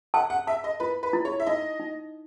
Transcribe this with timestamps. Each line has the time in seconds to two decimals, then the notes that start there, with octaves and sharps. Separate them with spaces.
0.14 F#5 A5
0.30 F#5
0.47 E5 A5
0.64 D#5
0.80 E4 B4
1.03 B4
1.13 E4
1.25 C#5
1.40 E5
1.47 D#4 D#5
1.80 D#4